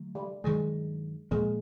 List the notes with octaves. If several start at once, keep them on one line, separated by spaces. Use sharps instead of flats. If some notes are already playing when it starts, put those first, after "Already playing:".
Already playing: D3 F#3 A3
G3
G2 D#3 F#3 G#3
A#2 F3 G#3 A#3